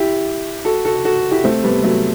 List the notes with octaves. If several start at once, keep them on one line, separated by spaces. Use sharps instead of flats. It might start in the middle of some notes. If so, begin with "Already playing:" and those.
Already playing: E4 G4
F#4 A4
F#4 A4
F#4 A4
E4 G4
A3 C4
G3 B3
F#3 A3